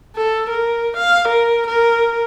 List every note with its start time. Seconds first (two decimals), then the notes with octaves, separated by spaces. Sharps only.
0.17 A4
0.50 A#4
0.97 F5
1.28 A#4
1.67 A#4